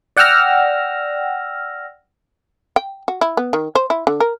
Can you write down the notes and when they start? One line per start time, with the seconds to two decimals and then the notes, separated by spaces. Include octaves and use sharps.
0.17 D5 F#5 G5 E6 F6 A#6
2.76 G5
3.08 F#4
3.21 E4
3.37 B3
3.53 D#3
3.75 C5
3.90 E4
4.07 D3
4.20 A#4